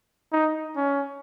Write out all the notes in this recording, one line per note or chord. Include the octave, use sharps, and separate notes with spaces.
D#4
C#4